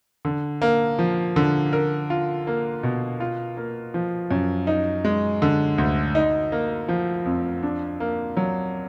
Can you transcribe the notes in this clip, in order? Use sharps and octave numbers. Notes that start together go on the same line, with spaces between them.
D3
A#3
F3
D3
A#4
F4
A#3
B2
F4
A#3
F3
F#2
D#4
G#3
D3
D2
D#4
A#3
F3
F2
D4
A#3
F#3